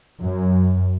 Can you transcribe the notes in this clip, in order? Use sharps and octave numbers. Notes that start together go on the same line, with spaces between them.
F#2